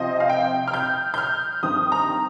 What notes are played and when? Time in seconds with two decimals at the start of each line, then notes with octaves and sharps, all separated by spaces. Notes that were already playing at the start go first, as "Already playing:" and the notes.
Already playing: C3 F3 C4 F4 D#5
0.20 F5
0.29 G5
0.68 F6
0.74 G6
1.14 G6
1.18 F6
1.63 G2 D#3 C4 D#6
1.92 A#5